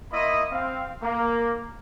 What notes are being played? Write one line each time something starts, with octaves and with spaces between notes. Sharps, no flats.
A#3 E4 D#5 B5 C6 D#6
C4 F5
A#3